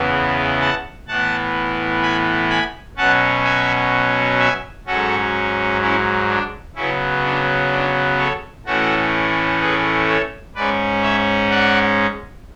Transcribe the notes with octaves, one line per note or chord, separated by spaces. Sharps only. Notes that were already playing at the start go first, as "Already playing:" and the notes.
Already playing: E2 C#3 E3 B3
F#5 A5
A2 E3 B3 F#5 A5
G#5 B5
G#5 B5
B2 F#3 C#4 F#5 A5
E5 G#5
E5 G#5
G#2 F#3 C#4 F#4 A4
C#4 E4
D4
C#3 F#3 B3 C#4 E4
D4
D4
A4 C#5
A2 E3 A3 C#4 F#4 A4
G#4 B4
A4 C#5
G#2 G#3 C#4 B4 D5
C#5 E5
D5 F#5